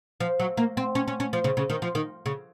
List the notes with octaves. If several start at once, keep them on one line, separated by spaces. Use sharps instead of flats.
F3
F#3
A#3
C4
C#4
C#4
C#4
F3
C#3
C#3
D#3
F3
D#3
C#3